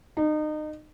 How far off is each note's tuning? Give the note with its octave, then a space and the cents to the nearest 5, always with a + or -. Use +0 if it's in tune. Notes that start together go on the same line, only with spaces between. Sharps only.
D#4 -30